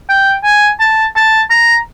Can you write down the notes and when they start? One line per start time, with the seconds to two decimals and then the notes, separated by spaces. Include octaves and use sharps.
0.09 G5
0.43 G#5
0.80 A5
1.16 A5
1.50 A#5